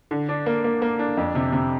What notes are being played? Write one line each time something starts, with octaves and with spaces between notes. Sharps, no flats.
D3
D4
A#3
A#3
A#3
D4
F2
C3
C3